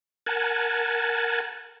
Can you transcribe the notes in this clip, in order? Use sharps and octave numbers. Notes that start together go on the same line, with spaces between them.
A#4 F#5 G#5 A5